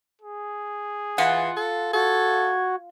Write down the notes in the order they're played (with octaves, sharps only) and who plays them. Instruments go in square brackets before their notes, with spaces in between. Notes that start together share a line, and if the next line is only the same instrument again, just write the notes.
[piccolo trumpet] G#4
[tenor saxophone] E3 [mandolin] F4 F#5
[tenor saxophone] A4
[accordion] F#4 [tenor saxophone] A4 [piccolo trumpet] G#6